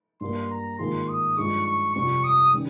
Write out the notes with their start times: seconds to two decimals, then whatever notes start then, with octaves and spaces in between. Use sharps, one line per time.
0.21 G2 G3 A#3 C6
0.50 A#5
0.78 G#2 D#3 A#3 F4 G#4 C6
1.08 D#6
1.37 G2 F3 G#3 C#6
1.66 C#6
1.95 F2 C3 G3 C4 F4 C#6
2.24 D#6
2.54 D#3 G3 C#4